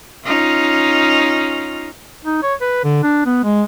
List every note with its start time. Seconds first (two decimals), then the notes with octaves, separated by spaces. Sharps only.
0.25 C#4 D#4 F4
2.25 D#4
2.43 C#5
2.61 B4
2.84 D3
3.03 D4
3.26 B3
3.44 G#3